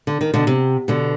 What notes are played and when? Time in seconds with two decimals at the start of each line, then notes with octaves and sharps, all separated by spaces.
0.07 D3
0.21 D#3
0.34 B2 D3
0.47 C3
0.88 B2 D3